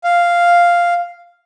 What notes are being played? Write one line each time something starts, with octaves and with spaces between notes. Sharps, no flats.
F5